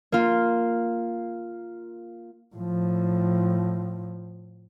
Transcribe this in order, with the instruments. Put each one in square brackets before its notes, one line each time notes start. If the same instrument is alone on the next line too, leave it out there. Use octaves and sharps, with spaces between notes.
[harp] A#3 F4
[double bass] A2 F3